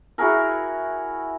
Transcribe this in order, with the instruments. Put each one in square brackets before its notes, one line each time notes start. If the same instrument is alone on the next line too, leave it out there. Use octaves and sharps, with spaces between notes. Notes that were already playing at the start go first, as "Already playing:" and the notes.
[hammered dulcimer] E4 F#4 G#4 A#4